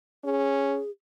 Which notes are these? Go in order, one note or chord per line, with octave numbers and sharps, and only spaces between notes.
C#4 G#4